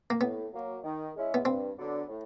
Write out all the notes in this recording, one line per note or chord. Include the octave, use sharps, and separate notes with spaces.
A#3
A2 B3
F#3 A#3
D#3
G#3 C#4 E4
B3
G2 C4
D3 F#3 B3 D4
A2